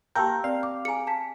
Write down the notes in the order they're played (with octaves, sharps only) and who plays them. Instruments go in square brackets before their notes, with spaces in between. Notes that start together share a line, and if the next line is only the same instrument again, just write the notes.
[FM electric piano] A#3 A#4 [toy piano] G4 C#6 [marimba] G5 A5 E6 [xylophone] G6
[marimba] C4 [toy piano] D5 [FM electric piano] F5
[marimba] D6
[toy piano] G#4 G#5 [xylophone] A#5 C#7
[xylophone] A5 B6